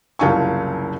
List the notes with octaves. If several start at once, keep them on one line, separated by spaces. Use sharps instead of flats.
F#1 C2 F4 G#5 C#6